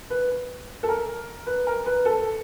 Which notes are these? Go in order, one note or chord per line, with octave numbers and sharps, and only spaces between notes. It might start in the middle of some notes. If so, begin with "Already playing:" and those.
B4
A4
A#4
B4
A#4
B4
A4